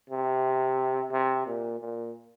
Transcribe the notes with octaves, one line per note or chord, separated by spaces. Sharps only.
C3
C3
A#2
A#2